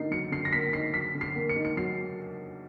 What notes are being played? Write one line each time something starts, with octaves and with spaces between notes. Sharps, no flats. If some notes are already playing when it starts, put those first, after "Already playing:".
Already playing: D3 A#3 D#4 C7
F#3 C#7
D3 C7
A#6
A#3 B6
D#4 C7
F#3 B6
D3
C7
A#3
C#7
D#4
C#7
F#3 C7